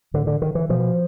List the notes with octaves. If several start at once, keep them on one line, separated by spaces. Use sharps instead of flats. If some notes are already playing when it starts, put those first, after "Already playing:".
A2 D3
D3
D#3
E3
B2 F3